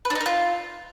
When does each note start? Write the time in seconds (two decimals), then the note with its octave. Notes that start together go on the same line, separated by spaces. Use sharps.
0.05 B4
0.10 D4
0.15 D#4
0.21 A#4
0.26 F4